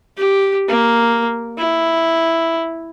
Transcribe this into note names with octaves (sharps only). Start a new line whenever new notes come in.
G4
A#3
E4